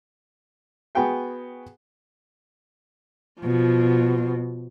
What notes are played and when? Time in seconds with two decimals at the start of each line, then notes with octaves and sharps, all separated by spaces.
0.95 B3 F#4 G#4 G5 G#5
3.41 B2 F3